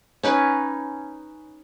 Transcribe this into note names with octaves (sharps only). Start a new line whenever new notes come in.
C#4 D#4 B4